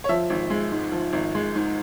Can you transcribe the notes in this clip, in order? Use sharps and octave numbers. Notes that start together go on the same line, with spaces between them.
C#5
F3 E5
G#1
G#3
G#2
F3
G#1
G#3
G#2